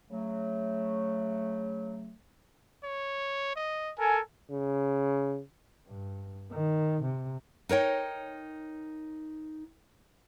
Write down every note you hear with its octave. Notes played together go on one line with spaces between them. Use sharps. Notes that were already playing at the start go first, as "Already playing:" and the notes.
C#3 F#3 A3
C#5
D#5
A4 A#4 G#5
C#3
G2
D#3
C3
D#4 A#4 C#5 G5